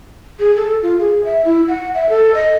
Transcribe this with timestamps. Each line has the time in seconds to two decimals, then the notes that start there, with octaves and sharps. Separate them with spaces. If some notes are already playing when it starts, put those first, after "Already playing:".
0.40 G#4
0.56 A4
0.83 F4
0.99 G#4
1.25 E5
1.45 E4
1.68 F#5
1.94 E5
2.09 A4
2.35 D#5